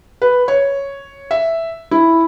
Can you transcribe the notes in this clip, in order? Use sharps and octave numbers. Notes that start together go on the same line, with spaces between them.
B4
C#5
E5
E4